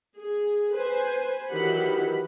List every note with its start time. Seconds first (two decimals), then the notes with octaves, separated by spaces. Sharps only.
0.16 G#4
0.73 B4 C5 G#5
1.50 D#3 E3 F#3 G4 F#5 B5